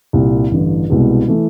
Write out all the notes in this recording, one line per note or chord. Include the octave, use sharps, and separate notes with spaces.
C2 A#2 G3
A1 G2 D3
C2 B2 G#3
E3 A3